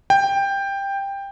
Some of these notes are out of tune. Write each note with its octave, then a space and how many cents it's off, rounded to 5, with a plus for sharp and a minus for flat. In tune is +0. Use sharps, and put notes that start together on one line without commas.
G5 +15